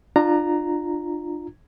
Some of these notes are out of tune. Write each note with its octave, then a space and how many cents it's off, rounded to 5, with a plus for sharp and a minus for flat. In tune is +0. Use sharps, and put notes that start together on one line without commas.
D4 +35 F4 +0 A#5 +0